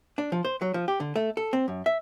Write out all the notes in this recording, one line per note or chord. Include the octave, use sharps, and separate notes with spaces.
D4
F3
C5
F#3
F3
G4
D3
A3
A4
C4
F#2
E5